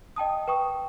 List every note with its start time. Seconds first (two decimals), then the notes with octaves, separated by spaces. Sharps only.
0.16 D#5 G5 A5 D#6
0.48 B4 G5 C#6 D#6